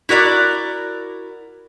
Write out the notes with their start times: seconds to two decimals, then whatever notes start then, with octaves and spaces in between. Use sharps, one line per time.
0.09 E4 F#4 A#4 D5